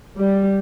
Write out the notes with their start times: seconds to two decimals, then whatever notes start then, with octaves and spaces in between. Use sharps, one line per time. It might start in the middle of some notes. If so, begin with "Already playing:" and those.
0.19 G3